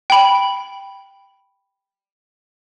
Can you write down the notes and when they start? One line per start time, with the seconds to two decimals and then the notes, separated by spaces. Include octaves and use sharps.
0.10 G5 B5